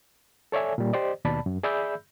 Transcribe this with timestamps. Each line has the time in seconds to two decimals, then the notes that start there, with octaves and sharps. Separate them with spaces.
0.52 A4 C#5 D5 E5 G#5
0.78 A#2 G3
0.93 G4 C5 D5 D#5
1.25 D#2 B2 D5 A5 B5
1.46 F#2
1.63 G#4 D5 E5 B5 E6 G6